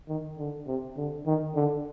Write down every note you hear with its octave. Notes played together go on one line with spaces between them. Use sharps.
D#3
D3
C3
D3
D#3
D3